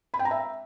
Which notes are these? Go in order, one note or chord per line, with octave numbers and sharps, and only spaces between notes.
B5
G5
A#5
E5